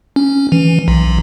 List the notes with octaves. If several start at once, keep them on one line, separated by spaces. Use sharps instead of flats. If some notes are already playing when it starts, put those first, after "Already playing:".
C#4
E3
B1